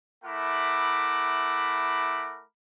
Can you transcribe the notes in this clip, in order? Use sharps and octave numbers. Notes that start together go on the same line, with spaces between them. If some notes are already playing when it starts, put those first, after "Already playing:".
A3 E4 A#4 F#5 B5 D6